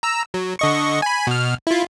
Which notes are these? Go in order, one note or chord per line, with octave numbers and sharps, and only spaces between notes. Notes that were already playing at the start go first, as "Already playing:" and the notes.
A#5 E6
F#3
D3 D#5 C#6
G#5 B5
B2 F6
E4 F4